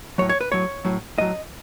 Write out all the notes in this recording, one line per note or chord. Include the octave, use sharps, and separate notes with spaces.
A2 F#3 C#5
C#5
B4
A2 F#3 C#5
A2 F#3
A2 F#3 D#5